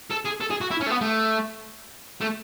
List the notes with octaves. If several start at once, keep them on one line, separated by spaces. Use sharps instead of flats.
A4
G#4
A4
G#4
F#4
E4
C#4
A3
B3
A3
A3